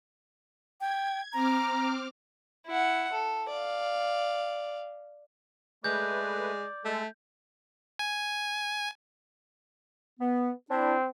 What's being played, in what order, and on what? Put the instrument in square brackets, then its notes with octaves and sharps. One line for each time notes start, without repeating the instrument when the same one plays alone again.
[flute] G5 [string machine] G#6
[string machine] C4 D6 F6 [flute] A#5
[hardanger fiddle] E4 F#5
A4
D5 F5
[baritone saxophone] G#3 [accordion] A3 B4 [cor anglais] D5 [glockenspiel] G6
[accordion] G#3 A4 [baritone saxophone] A3
[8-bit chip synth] G#5
[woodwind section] B3
[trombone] C4 [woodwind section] D4 E4